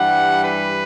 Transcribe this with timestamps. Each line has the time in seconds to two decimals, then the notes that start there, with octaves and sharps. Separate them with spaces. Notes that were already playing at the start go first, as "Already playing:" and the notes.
Already playing: G2 E3 G3 F#5
0.44 B4